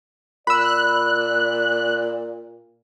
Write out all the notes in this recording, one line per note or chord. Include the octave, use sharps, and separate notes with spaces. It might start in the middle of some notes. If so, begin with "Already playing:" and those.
A#2 D5 B5 E6 F#6